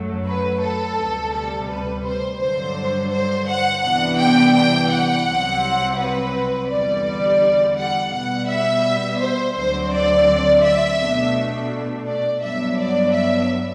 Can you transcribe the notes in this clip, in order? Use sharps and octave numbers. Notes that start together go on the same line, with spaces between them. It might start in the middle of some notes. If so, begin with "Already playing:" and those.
Already playing: F#2 F#3 A3
B4
A4
D2 C3 G3
A4
B4
C5
G2 D3 F#3 C5
C5
F#5
C2 C3 E3 B3 D4 F#5
G5
G5
F#5
C2 C3 F#3 C4
B4
E2 D3 G3 D5
F#5
B2 G3 B3 F#5
E5
C5
D2 D3 F#3 C4 C5
D5
E5
B2 A3 D4
D5
G2 F#3 B3 D4 E5
D5
E5